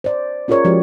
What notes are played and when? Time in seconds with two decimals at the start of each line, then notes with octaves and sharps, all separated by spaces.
0.04 C5 D5
0.48 C#4 F4 G#4 A#4 C#5 D5
0.65 F3 G#3 C#4 F#4 G4 D5